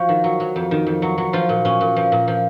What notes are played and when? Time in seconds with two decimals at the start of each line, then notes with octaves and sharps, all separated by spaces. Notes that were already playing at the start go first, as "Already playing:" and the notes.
Already playing: F3 F#4
0.09 D#3
0.24 F#3
0.40 F#3
0.56 F2
0.71 D#3
0.86 F2
1.02 F#3
1.18 F#3
1.33 F3 F4
1.49 A#2
1.65 A#2 C#4
1.81 A#2
1.96 F3
2.12 A#2
2.28 F3